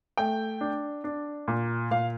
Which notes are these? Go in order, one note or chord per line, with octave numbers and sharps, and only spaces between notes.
A3 G5
D4
D4
A#2
A#2 F5